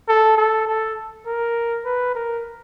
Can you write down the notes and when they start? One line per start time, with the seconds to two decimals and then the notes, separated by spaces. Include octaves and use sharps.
0.08 A4
0.37 A4
0.67 A4
1.26 A#4
1.85 B4
2.15 A#4